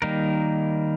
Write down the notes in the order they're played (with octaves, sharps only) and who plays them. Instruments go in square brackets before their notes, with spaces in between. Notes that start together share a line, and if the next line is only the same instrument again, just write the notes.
[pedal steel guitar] D#3 G3 A#3 D#4 A#4